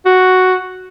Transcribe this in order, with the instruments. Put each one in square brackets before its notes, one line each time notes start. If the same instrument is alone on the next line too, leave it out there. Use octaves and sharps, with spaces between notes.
[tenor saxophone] F#4